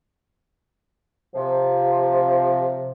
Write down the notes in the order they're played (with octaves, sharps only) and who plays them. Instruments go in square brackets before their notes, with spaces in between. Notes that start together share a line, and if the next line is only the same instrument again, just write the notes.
[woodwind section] C3 F3